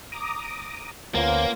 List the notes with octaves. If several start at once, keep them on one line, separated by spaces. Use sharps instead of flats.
A#5 D6 D#6
D2 A#3 B3 C#4 F4 C5